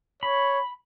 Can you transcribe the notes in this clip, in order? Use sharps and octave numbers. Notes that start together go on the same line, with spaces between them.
C#5 B5